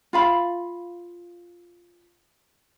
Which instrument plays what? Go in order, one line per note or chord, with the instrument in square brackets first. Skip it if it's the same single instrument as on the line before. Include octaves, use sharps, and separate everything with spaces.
[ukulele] F4 F5 B5